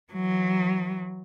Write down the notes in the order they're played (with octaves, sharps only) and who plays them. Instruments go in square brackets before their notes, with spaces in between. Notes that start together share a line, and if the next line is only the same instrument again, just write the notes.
[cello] E3 F#3